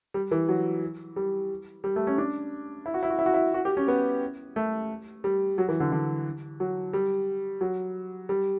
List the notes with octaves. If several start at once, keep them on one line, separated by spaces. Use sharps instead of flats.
G3
E3
F#3
G3
G3
A3
C#4
D4
E4
F#4
E4
F#4
E4
F#4
E4
F#4
G4
C#4
B3
A3
G3
F#3
E3
D3
D3
F#3
G3
F#3
G3